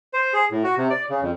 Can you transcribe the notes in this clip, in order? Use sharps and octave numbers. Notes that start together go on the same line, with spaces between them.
C5
G#4
A2
F#4
C3
D5
C#3
F2